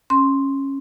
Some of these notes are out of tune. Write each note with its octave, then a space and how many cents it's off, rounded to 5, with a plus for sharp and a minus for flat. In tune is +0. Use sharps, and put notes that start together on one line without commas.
C#4 -15 C6 +0